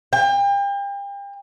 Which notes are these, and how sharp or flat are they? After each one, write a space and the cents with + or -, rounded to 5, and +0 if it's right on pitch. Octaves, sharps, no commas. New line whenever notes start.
G5 +35